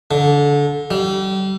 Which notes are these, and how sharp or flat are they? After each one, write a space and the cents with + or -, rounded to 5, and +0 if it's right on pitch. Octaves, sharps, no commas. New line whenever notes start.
D3 -25
G3 -35